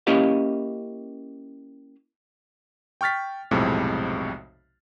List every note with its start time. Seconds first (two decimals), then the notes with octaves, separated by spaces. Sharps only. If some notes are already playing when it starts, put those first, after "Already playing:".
0.07 A#3 C#4 E4 G4 D#5 F5
3.01 G5 C#6 F6 A6 B6
3.51 B1 F2 A2 C3 G#3